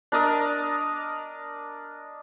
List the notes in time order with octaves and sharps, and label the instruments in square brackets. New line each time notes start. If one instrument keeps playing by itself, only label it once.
[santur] D4 A#4 D5 D#5